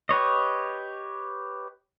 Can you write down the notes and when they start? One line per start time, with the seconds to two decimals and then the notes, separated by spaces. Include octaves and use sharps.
0.09 G4 B4 C#5 D#5